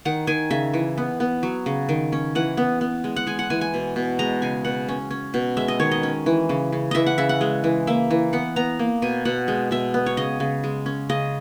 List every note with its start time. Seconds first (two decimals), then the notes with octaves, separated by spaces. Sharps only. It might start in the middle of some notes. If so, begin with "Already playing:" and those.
0.05 D#3 F#5
0.27 D#3 G#5
0.51 C#3 E5
0.74 E3
0.98 B3
1.20 B3
1.43 F#3
1.66 C#3
1.89 D#3
2.12 C#4
2.35 E3 F#5
2.57 B3
2.81 B3
3.04 G#3
3.16 F#5
3.27 G#3 G#5
3.39 F#5
3.50 E3 G#5
3.61 G#5
3.74 B2
3.96 B2
4.19 G#3 A#5
4.42 C#3 G#5
4.65 B2 F#5
4.89 C#4
5.11 C#4
5.34 B2
5.57 G#3 E5
5.68 D#5
5.80 D#3 C#5
5.91 D#5
6.03 C#4
6.26 E3
6.49 C#3
6.73 C#3
6.91 E3 D#5 E5
7.06 F#5
7.18 C#3 E5
7.29 F#5
7.41 G#3
7.64 E3
7.87 A#3 E5
8.11 E3
8.33 B3 F#5
8.56 B3 A#5
8.79 A#3
9.02 B2 G#5
9.25 B2 F#5
9.48 G#3
9.71 B2 E5
9.94 B3
10.06 C#5
10.17 C#3 D#5
10.40 C#3
10.64 G#3
10.86 C#4
11.09 C#3 D#5